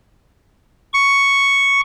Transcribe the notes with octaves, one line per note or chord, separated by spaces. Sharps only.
C#6